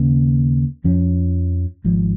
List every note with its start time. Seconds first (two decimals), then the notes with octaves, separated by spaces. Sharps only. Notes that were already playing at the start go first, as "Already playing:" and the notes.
Already playing: D#2 C#3 A#3 C#4
0.84 F2 F3 C#4
1.84 G#1 G#2 F3